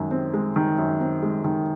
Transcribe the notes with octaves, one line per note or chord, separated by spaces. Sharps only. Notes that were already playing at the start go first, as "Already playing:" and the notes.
Already playing: F#2 D#3 G#3
C4
G#3
D#3
F#2
C4
G#3
D#3